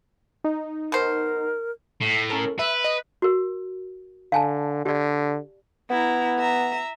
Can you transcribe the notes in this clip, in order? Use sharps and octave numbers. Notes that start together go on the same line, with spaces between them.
D#4
B2 A#4 C5
A2
C#4 A4 A#4
B4 E5
D#5
F#4 A#4
D3 F5 G#5 A5
D3 G4 D5
B3 E4 A#5
E5 A#5